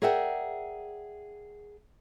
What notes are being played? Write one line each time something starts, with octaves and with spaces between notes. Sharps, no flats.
G#4 A#4 D5 E5 F#5 G5